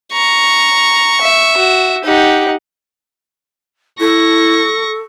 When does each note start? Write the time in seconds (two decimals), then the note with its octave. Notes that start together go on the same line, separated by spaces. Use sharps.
0.13 A#5 C#6
1.21 E5
1.57 F#4
2.04 D#4 G4 F#5
4.00 E4 A4 C#6 A#6